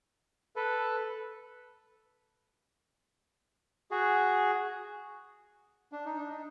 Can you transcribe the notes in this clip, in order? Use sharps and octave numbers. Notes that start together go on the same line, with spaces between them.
A4 B4
F#4 G#4
D4
D#4
D4
D#4